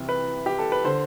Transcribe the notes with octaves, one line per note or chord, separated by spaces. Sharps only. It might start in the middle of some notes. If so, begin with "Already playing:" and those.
Already playing: C2 C3 E3
B4
G4
A4
B4
D3 C5